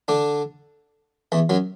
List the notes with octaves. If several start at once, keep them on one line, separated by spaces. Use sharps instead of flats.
D3 D4
E2 E3
F#2 F#3